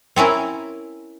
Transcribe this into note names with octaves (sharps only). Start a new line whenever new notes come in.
C4 C#4 E4 A#4